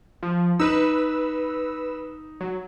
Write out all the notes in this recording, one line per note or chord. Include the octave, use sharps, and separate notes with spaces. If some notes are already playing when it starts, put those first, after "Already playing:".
F3
D#4 B4 E6
F#3